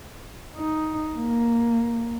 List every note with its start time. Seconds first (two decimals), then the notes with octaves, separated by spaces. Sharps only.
0.57 D#4
1.16 A#3